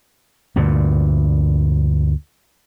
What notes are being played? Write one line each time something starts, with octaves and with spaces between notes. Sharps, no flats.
D2 G2 A#2